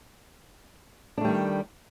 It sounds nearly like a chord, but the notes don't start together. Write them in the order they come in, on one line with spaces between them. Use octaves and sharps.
D4 A3 G3 D#3